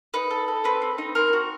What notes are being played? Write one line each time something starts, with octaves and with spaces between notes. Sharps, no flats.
D#4 B4
A4
A4
C4 B4
C4
D#4
C4 A#4
F#4